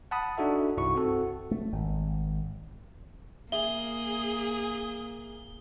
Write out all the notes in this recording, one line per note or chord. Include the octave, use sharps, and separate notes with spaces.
F#5 A5 B5 D#6
D4 D#4 F#4 A4 E5
C2 G2 E4 F#4 C#6
C4 F#4 A4
A3
G#1
A#3 G#4 E5 G7